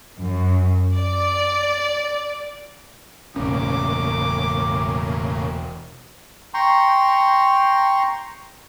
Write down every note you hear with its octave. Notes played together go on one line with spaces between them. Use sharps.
F#2
D5
E1 A2 C#3 A#3 C#4 D6
G5 A#5 C6 C#6